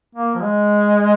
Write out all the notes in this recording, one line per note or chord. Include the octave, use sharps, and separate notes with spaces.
A#3
F3
G#3